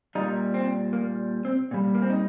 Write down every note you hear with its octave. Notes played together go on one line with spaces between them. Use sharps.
A#2 G3 D#4
C4
A#3
C4
A#2 G3
A#3
C4
D#4